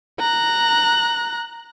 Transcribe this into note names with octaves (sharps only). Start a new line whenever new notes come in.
A#5 F#6